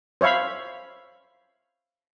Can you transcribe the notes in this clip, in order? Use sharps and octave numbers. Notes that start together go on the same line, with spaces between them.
C5 C#5 E5 F5 B5